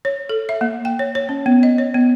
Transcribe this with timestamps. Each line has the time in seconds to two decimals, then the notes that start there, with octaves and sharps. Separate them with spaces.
0.05 C#5
0.29 A4
0.49 E5
0.61 A#3
0.85 G5
0.99 C#5
1.15 C#5
1.29 C#4
1.46 B3
1.63 D#5
1.78 C#5
1.94 B3